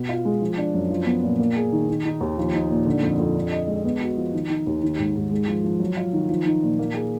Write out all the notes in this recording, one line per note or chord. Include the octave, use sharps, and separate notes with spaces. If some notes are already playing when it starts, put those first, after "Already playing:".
Already playing: B2 B3
F4
G#3
F3
D4
F#2
F3
B3
A#2
A#3
G#4
D#3
D#3
D#4
D#2
F3
D#4
A#2
D3
F2
F2
D4
D#5
G#3
B3
F#4
F3
D#3
D#4
D#2
D#3
G#2
G#2
G#3
F3
F3
F#3
F4
D#3
F3
D#4
A#2
A#3
G#4